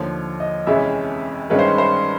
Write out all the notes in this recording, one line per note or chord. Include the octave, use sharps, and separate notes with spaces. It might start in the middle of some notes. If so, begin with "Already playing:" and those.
Already playing: D#2 D3 F3 C#5
D#5
F2 C3 E3 G#3 C#4 E5
G2 D#3 G#3 C#4 B4
C5
B4
C5